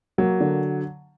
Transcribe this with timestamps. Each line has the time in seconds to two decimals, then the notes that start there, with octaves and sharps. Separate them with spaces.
0.18 F#3 A#3
0.41 D3